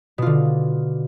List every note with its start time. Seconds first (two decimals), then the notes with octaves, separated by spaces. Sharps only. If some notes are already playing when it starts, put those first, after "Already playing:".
0.18 B2
0.22 F4
0.26 D3